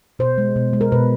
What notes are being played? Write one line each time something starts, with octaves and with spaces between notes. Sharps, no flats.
B2 C5
G#3
B2
G#3
A#4
B2 B4